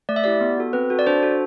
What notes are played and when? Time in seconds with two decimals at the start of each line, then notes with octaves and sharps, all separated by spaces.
0.09 A3 D5
0.16 E5
0.24 E4 G4 D5
0.41 B3
0.58 F#4 A4
0.73 C4 B4
0.90 F#4 A4
0.99 D5
1.07 D4 C5
1.23 F#4 A4